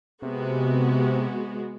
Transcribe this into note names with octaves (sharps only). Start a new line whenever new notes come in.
C3 G#3 B3 F#4